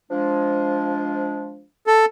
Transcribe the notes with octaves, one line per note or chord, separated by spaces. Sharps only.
F3 G#3 D4
A4